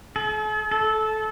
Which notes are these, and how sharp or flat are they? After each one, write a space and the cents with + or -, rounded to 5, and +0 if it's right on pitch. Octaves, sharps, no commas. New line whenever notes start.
A4 -45
A4 -15